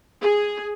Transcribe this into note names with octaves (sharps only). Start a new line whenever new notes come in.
G#4